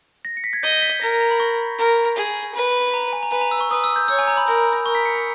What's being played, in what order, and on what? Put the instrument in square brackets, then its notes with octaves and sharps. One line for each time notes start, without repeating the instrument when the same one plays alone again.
[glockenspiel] A#6
C#7
B6
G#6
[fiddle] D#5 [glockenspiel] G6
[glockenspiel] B6
[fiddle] A#4 [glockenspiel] A#6
[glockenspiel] A#5
B5
C#6
[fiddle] A#4
G#4
B4
[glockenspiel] A#5
G#5
A#5
[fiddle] B4 [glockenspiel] G#5
[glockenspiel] A#5
E6
C#6
[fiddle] B4 [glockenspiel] D#6
[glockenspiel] E6
G6
[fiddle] C#5 [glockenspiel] E6
[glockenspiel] G#5
A#5
B5
[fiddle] A#4
[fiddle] A#4 [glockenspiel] C#6
[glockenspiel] B6
C#7
B6